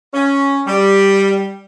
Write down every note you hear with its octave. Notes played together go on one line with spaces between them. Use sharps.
C#4
G3